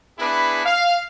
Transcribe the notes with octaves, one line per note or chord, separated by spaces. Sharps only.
B3 D4 E4 G#4 B4
F5